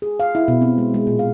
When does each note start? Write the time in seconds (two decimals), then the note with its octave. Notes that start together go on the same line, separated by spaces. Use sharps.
0.02 G#4
0.20 F5
0.35 E4
0.48 B2
0.61 C4
0.78 G#3
0.94 G#3
1.07 A#2
1.19 F5